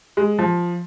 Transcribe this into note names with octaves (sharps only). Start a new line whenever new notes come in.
G#3
F3